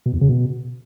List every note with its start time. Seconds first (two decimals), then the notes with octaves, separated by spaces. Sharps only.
0.06 B2
0.14 E2
0.21 C#3
0.29 B2